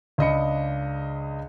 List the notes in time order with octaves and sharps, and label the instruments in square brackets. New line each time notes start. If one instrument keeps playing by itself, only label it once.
[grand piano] C#2 D4 D#5 B5 C#7